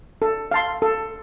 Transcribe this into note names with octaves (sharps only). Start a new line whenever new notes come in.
A4
F5 A5 C6
A4